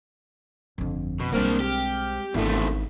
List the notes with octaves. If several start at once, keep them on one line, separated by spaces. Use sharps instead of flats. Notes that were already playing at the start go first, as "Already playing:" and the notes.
G1 F2 D3
B2
B1 G3 G#3 A#3 C4 D4 F6
G4
G#1 E2 G#2 A3 D4 E4 A4